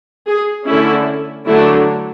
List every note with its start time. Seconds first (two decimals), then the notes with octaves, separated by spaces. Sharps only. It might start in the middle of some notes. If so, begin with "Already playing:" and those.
0.26 G#4
0.65 D3 A3 C#4 E4
1.46 D3 F#3 A3 D4 E4